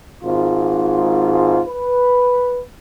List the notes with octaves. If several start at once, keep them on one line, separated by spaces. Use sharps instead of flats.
G#1 G#2 F4
B4